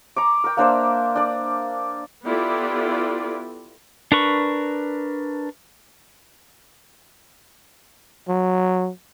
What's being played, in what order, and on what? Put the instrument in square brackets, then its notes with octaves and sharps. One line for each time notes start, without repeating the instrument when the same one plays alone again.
[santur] A#5 C#6 D6
A#4 G5
A#3 D4 C5 E5
D4 D5
[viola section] B3 E4 F4 G4 A4 D5
[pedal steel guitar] D4 A#4 B4 C#6
[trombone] F#3